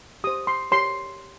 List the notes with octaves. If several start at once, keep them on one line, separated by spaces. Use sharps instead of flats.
G4 C5 D#6
C6
G4 A#4 C#5 C6